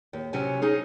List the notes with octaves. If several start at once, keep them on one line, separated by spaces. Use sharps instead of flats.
D#2
C3 F#3 C#4 E4 G#5
C#4 D#4 G#4